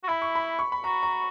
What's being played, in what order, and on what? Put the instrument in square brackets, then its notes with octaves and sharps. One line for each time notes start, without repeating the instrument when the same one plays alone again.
[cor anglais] F#4
[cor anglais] E4 [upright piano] B5
[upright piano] C#6
B5
C#6
B5
[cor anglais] F#4 [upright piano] A#5
[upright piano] A#5